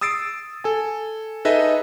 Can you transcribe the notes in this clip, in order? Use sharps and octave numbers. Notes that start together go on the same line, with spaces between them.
D#6 E6 A6 C7 D7
A4 G#5
D#4 G#4 A4 B4 D#5 E5